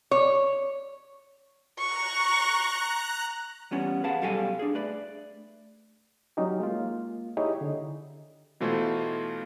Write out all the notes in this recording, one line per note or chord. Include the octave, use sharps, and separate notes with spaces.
C#5
A#5 C#6 F#6
E3 G3 B3 C#4 F4
G#4 B4 F5 F#5 A5
B1 G3 A4 F5 G5 G#5
D4 G#4
A3 B4 D5
F#3 C#4 D#4 G4
G#3 A#3 F4
D#4 E4 G4 G#4 C#5 D#5
D3
B2 E3 A3 F4 C5